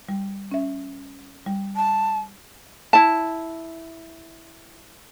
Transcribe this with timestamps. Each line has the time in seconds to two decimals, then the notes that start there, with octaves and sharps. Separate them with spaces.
0.09 G3
0.51 C#4 E5
1.46 G3
1.76 A5
2.93 E4 A5